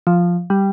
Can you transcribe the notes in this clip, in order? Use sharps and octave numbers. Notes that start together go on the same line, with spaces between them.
F3
G3